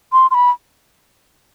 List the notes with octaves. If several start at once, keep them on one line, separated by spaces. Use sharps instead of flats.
C6
C6
B5